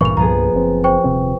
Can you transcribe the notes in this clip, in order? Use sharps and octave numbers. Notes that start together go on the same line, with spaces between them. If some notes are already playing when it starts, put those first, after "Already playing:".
A1 G2 A#2 E3 C#6 F7
C2 G2 F3 B3 G#4 A#5
F#1 C4
C5 G5 C#6
D#1 C3 C4